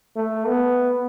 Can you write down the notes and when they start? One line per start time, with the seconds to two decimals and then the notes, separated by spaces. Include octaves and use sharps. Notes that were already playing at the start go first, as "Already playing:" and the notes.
0.16 A3
0.47 B3